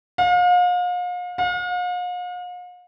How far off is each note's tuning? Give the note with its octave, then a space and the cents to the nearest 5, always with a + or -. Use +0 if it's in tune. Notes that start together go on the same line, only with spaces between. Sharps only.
F5 +40
F5 +45